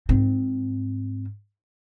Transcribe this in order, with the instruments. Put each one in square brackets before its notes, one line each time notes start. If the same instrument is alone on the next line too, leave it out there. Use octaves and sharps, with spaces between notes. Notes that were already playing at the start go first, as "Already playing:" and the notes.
[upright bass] G#2 C4